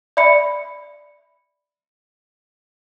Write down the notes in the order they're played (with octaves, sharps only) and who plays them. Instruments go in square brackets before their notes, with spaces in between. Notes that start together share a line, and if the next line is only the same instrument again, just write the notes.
[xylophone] D5 E5 B5 C#7